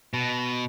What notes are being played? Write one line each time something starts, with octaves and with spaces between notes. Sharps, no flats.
B2